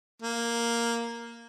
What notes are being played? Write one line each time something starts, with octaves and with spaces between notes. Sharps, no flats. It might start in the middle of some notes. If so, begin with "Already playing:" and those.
A#3